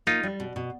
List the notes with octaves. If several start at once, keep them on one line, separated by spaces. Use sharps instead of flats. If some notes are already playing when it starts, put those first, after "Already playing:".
A#3 D#4 F4
G3
B2
B2